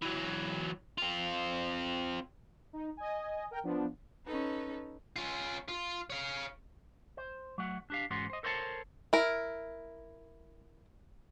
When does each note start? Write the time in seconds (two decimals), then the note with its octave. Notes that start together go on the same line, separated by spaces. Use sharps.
0.02 E3 F#3
0.98 C4 F4
2.73 D#4
2.97 D#5 G#5
3.51 A#4 G5
3.64 F3 B3 D4
4.26 C#4 D#4 A4 B4
5.16 C#4 F4
5.68 F4
6.10 C#5 F5
7.17 C5
7.58 F#3 A3 F#5
7.90 D4 G4 F5
8.10 E2 G#2 B3 C#4 F#4 C6
8.30 C5 D#5
8.43 A4 A#4 C5 C#5 F5 A5
9.13 E4 A#4